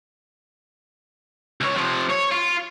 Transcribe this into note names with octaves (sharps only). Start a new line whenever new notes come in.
C#2 C#5
C3 F3
C#5
F4